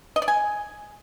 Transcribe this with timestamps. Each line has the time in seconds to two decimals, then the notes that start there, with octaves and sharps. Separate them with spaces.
0.16 D#5
0.22 D5
0.28 G#5